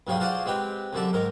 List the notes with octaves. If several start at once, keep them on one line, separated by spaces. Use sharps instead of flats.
B1 G2 C#3 F3 G5 C6
F4 F#4 G#4 C5 D5 C6
G#3 C4 G4 B4
C2 F#2 D3 D5 E5
G#2 D#3 A#4